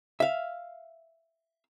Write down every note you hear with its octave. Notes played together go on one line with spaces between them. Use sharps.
E5 F5